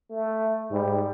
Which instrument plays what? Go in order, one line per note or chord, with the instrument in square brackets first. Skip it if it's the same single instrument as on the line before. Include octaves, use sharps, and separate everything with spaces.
[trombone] A3
[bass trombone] G#2 [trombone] G3